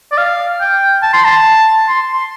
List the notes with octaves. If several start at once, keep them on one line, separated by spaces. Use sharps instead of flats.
D5
F5
G5
A5
C6
A5
C6
C6